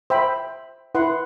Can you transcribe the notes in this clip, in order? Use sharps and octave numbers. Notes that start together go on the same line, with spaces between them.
C5 E5 G5 B5
E4 B4 F#5 C6